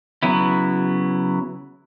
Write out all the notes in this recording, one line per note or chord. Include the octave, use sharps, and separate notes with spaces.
C#3 F#3 B3 E4